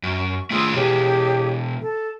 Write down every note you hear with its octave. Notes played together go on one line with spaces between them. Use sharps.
F#2 C#6
A3 F4 G#4 C6 D#6 E6
B2 E3 G4 G#4 C#5
A4